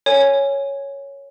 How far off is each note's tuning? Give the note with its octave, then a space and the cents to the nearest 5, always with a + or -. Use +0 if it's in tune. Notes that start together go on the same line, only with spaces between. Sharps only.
A#4 -25 C#5 +0 G#5 +0